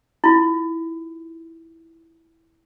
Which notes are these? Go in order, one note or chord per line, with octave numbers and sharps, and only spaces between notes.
E4 F4